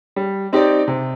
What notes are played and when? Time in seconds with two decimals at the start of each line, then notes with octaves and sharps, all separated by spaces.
0.16 G3
0.53 C4 D#4 G4 D5
0.88 C3